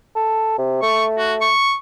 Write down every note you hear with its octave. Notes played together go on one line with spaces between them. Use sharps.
A4
C3
A3 C#6
F#4
C#6